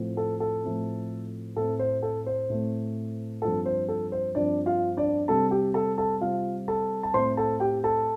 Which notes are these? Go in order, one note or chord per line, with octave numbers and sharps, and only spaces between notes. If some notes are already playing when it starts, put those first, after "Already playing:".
Already playing: A2 F3 A3 C4
A4
A4
A2 F3 A3 C4
A2 A3 C4 A4
C5
A4
C5
A2 A3 C4
G2 F3 C4 A4
C5
A4
C5
G2 F3 C4 D4 D5
F4 F5
D4 D5
C3 G3 C4 A4 A5
G4 G5
A4 A5
A4 A5
C3 G3 C4 F4 F5
A4 A5
A5
A2 A3 C4 C5 C6
A4 A5
G4 G5
A4 A5